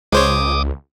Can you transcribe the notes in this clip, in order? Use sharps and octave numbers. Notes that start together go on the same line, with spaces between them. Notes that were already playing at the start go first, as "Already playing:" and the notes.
C#2 G#3 C5 C#5 D6 D#6